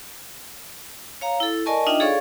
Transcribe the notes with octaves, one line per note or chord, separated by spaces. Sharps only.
C#5 F5 A#5
E4 A4
A#4 D5 D#5 G#5 A5 C#6
D4 D#4 F4 D#5 E5 G5
G#4 A4 C#5 D5 F5 C#6